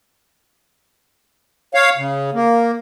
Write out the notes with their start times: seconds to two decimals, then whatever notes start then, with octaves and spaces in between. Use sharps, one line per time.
1.74 C#5 F5
1.97 C#3
2.34 A#3